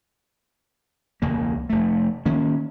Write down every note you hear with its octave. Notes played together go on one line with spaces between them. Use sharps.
E1 C#2 C#3 A#3
F1 A3
D#3 A#3 C#4